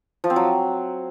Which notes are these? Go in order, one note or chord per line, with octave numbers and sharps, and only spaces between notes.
F3
C4
F#3